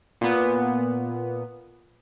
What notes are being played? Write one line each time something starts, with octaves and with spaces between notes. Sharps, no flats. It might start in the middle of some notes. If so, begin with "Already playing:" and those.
A#2 B3